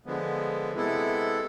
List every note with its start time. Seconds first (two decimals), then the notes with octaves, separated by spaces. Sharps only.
0.06 D3 F3 G#3 B3
0.73 C3 G#3 B3 E4 A4